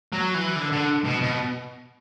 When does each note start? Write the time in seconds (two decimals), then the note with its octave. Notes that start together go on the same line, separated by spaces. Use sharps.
0.12 F#3
0.34 E3
0.56 D3
0.72 D3
1.04 B2
1.21 B2